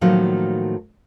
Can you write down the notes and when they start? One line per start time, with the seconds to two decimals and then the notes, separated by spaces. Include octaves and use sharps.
0.01 A2 D#3 F3 F#3 A3 A#3